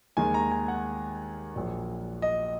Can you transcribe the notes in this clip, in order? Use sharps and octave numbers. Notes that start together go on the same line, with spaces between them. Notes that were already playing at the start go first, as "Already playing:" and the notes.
D#2 D#3 G#3 G#5
A#5
G#5
F#5
A#1 A#2 F#3
D#5